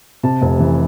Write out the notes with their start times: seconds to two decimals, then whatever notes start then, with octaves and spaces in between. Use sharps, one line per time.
0.23 C3 A5
0.42 F1
0.59 E3